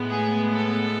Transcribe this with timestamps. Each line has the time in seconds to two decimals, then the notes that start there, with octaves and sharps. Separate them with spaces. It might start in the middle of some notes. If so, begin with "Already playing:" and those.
Already playing: A2 G#3 B3
0.09 G#4
0.54 A4